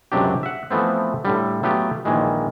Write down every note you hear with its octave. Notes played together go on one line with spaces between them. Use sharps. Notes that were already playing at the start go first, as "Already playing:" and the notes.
C#2 F#2 C3 F#3 D4 G4
E5 F#5
E3 F3 A3 B3 C4
A2 D3 G3
F#3 A3 B3 F4 G4
A#1 A#2 D#3 E3 G#3